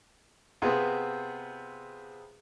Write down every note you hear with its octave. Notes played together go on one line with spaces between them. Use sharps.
C3 B3 C4 F4 G#4